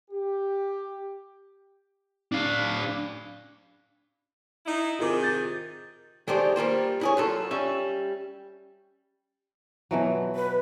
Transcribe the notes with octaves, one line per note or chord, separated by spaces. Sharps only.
G4
D4 F5
D#4 E4
C3 D#3 F4 G#4 A#4 D6
G6 A6
D#3 G#3 A3 G4 C5 D5
G3 A#3 F4 C5
E4 G#4 C#5
F#2 F4 A4
G3 C#4 E5
B2 E3 F#3
B4